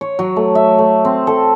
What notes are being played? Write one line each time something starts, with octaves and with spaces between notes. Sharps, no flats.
C#5
F#3
A3
E5
A3
C4
A4